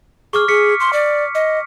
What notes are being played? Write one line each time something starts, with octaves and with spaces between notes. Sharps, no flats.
G#4 C#6 D6 F6
G#4 B6 C#7
C6
D5
D#5